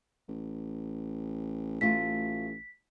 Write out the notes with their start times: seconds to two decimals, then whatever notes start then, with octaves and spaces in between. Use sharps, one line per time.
0.28 A1
1.81 A1 A3 F4 B6